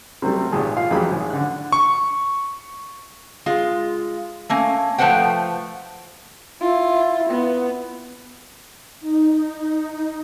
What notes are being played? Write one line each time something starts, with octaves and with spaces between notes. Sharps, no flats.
C3 F#3 G3 A3
G#1 A#2 G4 G#4 A5
F4 F5
F2 E3 F#3 G4 G#4 B5
G#1
D3 F#6
C#6
G#3 F4
A3 A#3 C#4
F3 A3 B4 C5 F#5 G5
E4 F4
B3
D#4